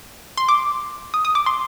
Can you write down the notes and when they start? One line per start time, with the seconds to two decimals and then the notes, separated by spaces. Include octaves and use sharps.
0.37 C6
0.49 D6
1.14 D#6
1.25 D#6
1.35 D6
1.46 C6